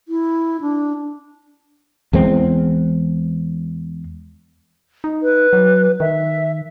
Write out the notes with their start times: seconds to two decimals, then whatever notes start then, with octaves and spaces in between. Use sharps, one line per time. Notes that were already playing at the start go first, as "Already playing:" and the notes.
0.08 E4
0.61 D4
2.13 E2 G#3 C4
5.04 D#4
5.23 B4
5.53 F#3
6.00 D#3 E5